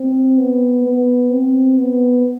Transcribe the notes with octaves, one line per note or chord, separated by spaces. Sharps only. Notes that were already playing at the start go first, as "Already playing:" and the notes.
Already playing: C4
B3
B3
C4
B3